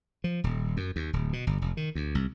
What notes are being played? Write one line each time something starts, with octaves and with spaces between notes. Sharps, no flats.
F3
D#1
F#2
D#2
D1
B2
G1
F1
D#3
D2
C2